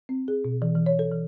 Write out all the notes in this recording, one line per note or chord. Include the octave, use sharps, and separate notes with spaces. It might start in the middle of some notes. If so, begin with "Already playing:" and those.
C4
G#4
B2
E3
E3
C#5
A4
E3